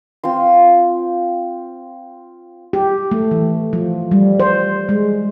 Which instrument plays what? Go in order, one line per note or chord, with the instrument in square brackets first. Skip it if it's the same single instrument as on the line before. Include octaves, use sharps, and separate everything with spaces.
[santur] C4 F4 C6
[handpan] G4
A3
E3
F3
G3
C5
G#3